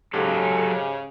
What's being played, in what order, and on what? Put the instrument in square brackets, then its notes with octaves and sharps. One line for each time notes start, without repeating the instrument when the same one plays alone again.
[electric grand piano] G#2 G4 [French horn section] C#3 [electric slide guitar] F#3 A4